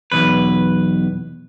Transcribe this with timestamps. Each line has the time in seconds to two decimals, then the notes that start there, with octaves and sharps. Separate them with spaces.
0.12 B1 E2 B4